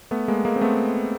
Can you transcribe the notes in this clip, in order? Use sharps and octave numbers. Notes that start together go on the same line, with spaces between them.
A3 B3
G#3 A#3
G#3 A#3
C4
A3 B3